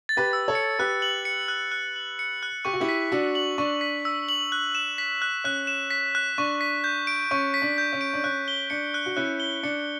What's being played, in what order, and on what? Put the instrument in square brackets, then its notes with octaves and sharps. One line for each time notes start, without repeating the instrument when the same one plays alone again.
[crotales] A6
[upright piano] G4 B4
[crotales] E6
[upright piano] A4 C#5
[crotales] C#7
[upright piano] G4 B4 [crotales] F#6
[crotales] F#7
C#7
F#6
F#6
F#7
C#7
F#6
[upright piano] G4 [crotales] C#6
[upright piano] F#4
E4 G4
[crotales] B6
[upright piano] D4 F#4 [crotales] E6
[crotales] F#7
[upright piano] D4 [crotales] C#6
[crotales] B6
E6
F#7
F#6
E7
B6
F#6
[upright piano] C#4 [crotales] F#6
[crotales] E7
B6
F#6
[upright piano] D4 [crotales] C#6
[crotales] B6
G6
D7
[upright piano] C#4 [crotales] C#6
[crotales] B6
[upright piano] D4
[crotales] G6
[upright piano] C#4
[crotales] D7
[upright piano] D4
[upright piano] C#4 [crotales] F#6
[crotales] G7
[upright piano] D4 [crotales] C#7
[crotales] F#6
[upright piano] F#4
[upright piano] C#4 E4 [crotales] F#6
[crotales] G7
[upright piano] D4 [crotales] C#7